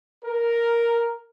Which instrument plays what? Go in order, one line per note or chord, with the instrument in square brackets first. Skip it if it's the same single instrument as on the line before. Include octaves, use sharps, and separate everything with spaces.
[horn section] A#4